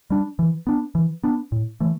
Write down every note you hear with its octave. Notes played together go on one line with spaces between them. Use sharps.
G3 D4
E3
B3 D4
E3
B3 D4
A2
E3 A3